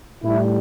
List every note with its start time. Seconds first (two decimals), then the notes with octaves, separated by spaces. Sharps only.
0.23 A2 G3 E4